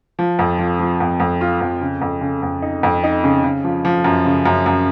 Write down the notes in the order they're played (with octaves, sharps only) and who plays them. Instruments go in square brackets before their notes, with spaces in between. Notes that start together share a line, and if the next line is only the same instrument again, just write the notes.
[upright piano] F3
F2
F3
F3
F2
F2
F4
F2
C#3
F2
C#3
F2
D#4
F2
D#4
C#3
C#3
F3
F3
F#2
C#3
F#2
F#2